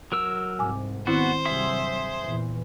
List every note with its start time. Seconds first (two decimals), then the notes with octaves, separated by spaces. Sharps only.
0.12 F#3 A#4 E6
0.59 C2 G#2 C3 G#5 D6
1.07 D#3 B3 C4 E4 F#4 C5
1.45 G2 C3 F#3 G#4 E5 C6
2.24 E2 A#2 E3